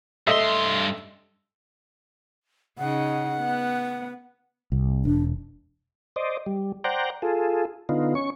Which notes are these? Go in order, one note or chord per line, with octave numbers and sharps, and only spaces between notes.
G2 A3 D#5 E5 C6
C#3 D#4 F#5
B3
C2
E1 D4
C5 D5 D#5
G3
C5 D5 F#5 G5 A#5
F4 G#4 A4
D3 B3 D#4 F4
C#4 C#6